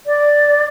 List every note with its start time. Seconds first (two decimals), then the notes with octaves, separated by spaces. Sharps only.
0.07 D5